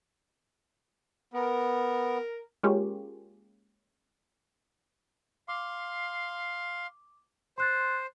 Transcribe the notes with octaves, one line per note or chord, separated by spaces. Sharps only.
B3 A#4
G#3 A#3 C#4 F4 G4
F5 C6 D6
C5 C6 F#6 A6